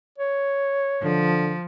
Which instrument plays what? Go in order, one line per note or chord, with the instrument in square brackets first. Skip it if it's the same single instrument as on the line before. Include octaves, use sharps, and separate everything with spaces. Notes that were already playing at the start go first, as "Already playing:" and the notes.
[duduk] C#5
[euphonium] D3 [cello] F3